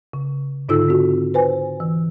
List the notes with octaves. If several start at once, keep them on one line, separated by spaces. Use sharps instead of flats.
C#3
G#2 D3 D#4 F4 A4 E6
C4 F#4
B4 C5 G#5
E3